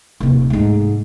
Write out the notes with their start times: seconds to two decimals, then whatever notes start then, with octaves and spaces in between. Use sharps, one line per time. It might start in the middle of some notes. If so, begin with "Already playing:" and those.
0.20 D#1 C3
0.50 G#2 A3